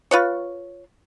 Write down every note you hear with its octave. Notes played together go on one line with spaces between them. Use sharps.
F4 B4 C#5